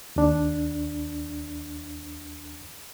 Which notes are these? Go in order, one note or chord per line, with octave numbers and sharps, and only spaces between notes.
D#2 D4